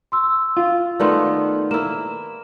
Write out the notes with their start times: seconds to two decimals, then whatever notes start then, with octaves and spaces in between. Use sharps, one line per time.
0.12 C6 E6
0.57 F4
1.00 D#3 A3 B3 D5 C6
1.71 A#3 E4 E7